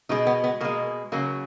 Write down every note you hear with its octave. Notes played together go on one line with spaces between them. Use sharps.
B2 G#3 D#4
B3
B3
B2 G#3 A#3
C#3 F#3 A#3